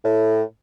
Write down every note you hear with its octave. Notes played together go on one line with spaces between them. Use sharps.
A2